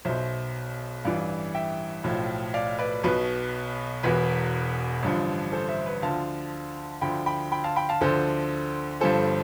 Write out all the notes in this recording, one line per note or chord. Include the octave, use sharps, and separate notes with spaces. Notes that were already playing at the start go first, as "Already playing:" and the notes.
B1 B2 C5 E5
A1 G2 E3 D5 F5
E5 G5
B1 A2 F3
D5 F5
B4 D5
B1 B2 B4
E1 E2 B2 B4
A1 G2 D3 F3
A4 C5
C5 E5
B4
D2 D3 F3 F5 A5
D2 D3 F3 G5 B5
G5 B5
G5 B5
F5 A5
G5 B5
F5 A5
D2 D3 F3 A4 C5
G1 G2 F3 A4 C5